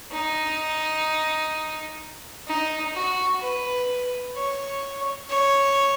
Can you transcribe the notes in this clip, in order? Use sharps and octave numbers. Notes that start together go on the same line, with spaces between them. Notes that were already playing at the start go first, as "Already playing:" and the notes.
D#4
D#4
F#4
B4
C#5
C#5